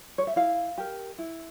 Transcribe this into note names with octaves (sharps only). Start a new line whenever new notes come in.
C#5
E5
E4 F5
G4 A#4
E4